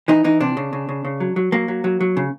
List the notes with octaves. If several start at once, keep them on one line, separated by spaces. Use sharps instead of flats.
E3 D#4
E3 D#4
C3 D4
C#3
C#3
C#3
C#3
F#3
F#3
F#3 A#3
F#3
F#3
F#3
C#3